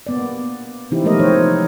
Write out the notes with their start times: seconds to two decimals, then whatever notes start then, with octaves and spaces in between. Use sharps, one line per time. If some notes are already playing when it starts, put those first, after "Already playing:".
0.07 A#3 B3 D5
0.91 C3 E3 C4 D#4 E4 G4
1.04 F3 G#3 A3 B3 A#4 D#5
1.19 E3 F3 C4 D#4 C5 C#5